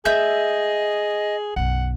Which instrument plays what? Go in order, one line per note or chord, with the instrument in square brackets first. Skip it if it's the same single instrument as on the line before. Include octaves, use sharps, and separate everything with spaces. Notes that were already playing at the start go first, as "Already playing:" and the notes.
[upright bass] A3 [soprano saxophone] G#4 [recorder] D#5 [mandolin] E5 G6
[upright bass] B1 F#2 [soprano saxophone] F#5